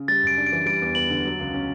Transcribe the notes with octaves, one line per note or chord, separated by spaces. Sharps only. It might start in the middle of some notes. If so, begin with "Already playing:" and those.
Already playing: C#3
G3 A6
F#2 D7
D4
D7
E3
G3 D7
E2
B3 F#7
D3
F#3
C#2
C#4